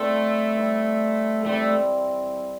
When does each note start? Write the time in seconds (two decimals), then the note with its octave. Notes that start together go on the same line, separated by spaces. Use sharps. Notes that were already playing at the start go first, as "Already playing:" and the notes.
Already playing: G3 A3 C4 E4 B4
0.55 G3 C4 E4 B4
1.46 E3 G3 A3 C4